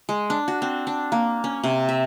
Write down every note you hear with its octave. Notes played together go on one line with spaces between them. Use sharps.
G#3
D4
F#4
C4
D4
A#3
C#4
C3
E5